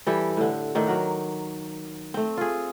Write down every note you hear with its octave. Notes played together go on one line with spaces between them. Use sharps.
E3 G3 G4 A4
A2 D3
A2 D#3 A4 D5
F#3 A#4 F#5
A3 C4
F4 G#4